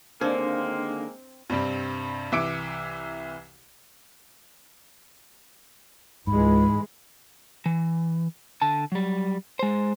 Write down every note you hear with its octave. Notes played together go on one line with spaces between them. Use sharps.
D#2 D3 G#3 A#3 C4 D4 D5
G2 C3 G3 C4
C2 E3 E5 D6 C#7 D7
C#2 G#2 E3 G#3 B5
E3
D3 A5
F#3 G3
G#3 C5